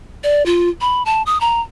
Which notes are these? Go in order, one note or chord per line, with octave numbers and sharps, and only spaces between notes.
D5
F4
B5
A5
D#6
A#5